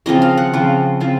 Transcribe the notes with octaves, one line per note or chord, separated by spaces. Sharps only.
C#3 F3 C4 F4 D#5
F5
F#5
C#3 F3 C4 F4
C#3 F3 C4 F4